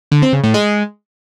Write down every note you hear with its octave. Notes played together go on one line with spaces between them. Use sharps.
D3
C4
C#3
A2
G#3